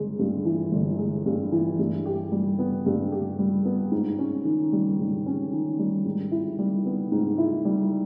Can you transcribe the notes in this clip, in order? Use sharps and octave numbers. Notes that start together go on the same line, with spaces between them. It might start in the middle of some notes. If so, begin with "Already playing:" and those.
Already playing: G1 G#3
G2
E3
G1
G#3
G2
E3
G2
G4
G3
B3
G2
G4
G3
B3
G#2
C#4
D#3
G3
G#2
C#4
D#3
G3
G#2
E4
G3
B3
G#2
E4
G3